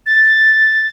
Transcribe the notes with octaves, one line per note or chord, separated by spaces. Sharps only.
A6